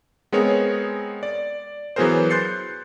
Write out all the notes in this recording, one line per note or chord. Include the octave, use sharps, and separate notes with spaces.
G#3 B3 C4 G#4 A#4 C#5
D5
E3 F#3 B3 G#4 A#4 C5
C6 F#6 G6 A6 C7 C#7